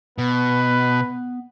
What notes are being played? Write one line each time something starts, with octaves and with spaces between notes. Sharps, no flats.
B2 B3 B4